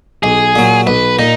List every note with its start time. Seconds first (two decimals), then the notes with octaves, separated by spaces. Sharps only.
0.23 B1 G#4
0.56 A#2 F#3
0.87 B1 B4
1.19 A#2 D#4